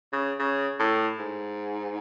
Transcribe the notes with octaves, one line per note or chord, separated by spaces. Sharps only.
C#3
C#3
A2
G#2